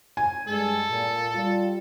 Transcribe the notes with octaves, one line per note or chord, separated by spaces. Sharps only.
G#5
G2 G#3 A4
A#2
G3 F4